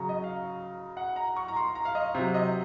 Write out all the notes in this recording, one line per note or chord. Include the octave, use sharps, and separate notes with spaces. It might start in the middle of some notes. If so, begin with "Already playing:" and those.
Already playing: C#3 F#3 A#5 C#6
D#5
F5
F#5
A#5
C#6
A#5
C6
A#5
F5
D#5
C3 F#3 C5
D#5